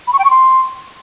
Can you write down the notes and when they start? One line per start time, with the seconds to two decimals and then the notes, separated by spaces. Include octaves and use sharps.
0.07 B5
0.13 C#6
0.19 G5
0.25 C#6
0.30 C6